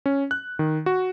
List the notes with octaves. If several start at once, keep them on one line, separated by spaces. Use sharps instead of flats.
C#4
F#6
D#3
F#4